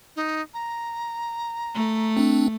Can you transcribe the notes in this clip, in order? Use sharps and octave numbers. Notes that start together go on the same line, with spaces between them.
D#4
A#5
A3
C4 D4